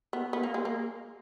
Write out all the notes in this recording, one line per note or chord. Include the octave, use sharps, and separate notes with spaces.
B3
B3
A#3
G#3
A#3